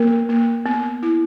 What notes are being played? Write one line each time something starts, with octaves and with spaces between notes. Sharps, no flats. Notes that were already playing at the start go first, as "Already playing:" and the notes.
Already playing: A#3 A#4
A#3
B3
E4